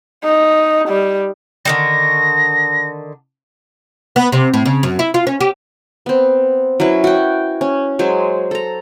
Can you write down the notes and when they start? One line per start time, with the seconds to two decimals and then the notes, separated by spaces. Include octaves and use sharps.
0.24 D#4
0.89 G3
1.65 D3 D#3 G3 A#6
4.16 B3
4.32 C3
4.54 A2
4.66 C#3
4.83 F#2
4.99 E4
5.14 F4
5.27 C#4
5.41 G4
6.06 B3 C4
6.80 F#3 C#4 E4 B4
7.04 F#4 G5
7.61 C#4
7.99 F#3 G#3 C5 G#5
8.51 A4 A#5